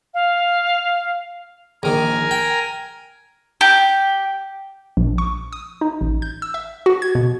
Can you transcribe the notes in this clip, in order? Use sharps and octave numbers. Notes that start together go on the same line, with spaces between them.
F5
A#1 D#3 A#4 G#5 A#5
G5
G4
A#1
C#6
D#6
D#4
A1
G6
E6
E5
F#4
G#6
B2